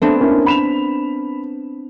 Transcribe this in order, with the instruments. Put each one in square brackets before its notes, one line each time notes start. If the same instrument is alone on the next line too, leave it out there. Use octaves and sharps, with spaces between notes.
[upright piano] A3 [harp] B3 C4 D4
[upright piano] A#3 C#4 E4
B5 E7 F7